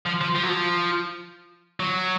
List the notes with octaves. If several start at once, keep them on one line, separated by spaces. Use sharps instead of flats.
F3
F3
F3
F#3
F3
F#3